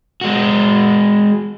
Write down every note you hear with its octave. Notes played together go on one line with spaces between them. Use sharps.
G#3 F#4